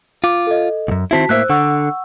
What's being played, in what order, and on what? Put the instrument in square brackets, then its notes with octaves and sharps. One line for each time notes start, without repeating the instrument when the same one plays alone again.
[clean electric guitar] F4 [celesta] D6
[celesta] A4 D#5
[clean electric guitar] C2 F#2
[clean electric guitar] D#3 C4 E4 [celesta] F#4 A5 B6
[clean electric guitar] A2 A#3 E5 [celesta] C5 E6 F#6
[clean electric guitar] D3 [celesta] F#5 C#6 E6